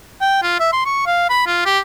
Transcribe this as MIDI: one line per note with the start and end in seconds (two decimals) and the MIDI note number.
0.21 0.41 79
0.43 0.57 65
0.60 0.69 76
0.73 0.82 84
0.86 1.05 85
1.06 1.28 77
1.30 1.44 83
1.47 1.62 65
1.66 1.79 67